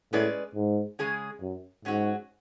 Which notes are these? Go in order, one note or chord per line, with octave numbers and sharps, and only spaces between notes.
A2 G#3 C#4 G#4 B4 D5
G#2
C#3 G#3 C#4 G#4
F#2
G#2 F#3 C#4 F#4